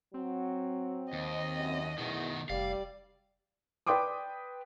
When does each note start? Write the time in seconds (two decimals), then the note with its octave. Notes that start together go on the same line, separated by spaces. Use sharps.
0.14 F#3 C4
1.13 D#2 D#5
1.59 F#2
1.98 E2 B2 D#3
2.49 F1 G3 D5 F5
3.87 B4 D5 G5 C6 D6 D#6